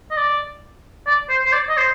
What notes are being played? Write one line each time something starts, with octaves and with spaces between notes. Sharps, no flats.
D#5
D5
D5
C5
C5
D5
D#5
C5